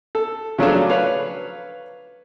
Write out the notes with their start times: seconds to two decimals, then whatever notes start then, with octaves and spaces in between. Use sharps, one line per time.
0.15 A4
0.58 C#3 F3 F#3 A3 C#4 D4
0.90 B4 C#5 F5